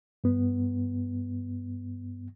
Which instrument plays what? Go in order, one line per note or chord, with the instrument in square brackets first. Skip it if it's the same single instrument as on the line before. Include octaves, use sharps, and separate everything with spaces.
[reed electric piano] G2 B3